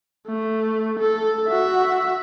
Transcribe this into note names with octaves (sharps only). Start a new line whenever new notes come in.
A3
A4
F#4 E5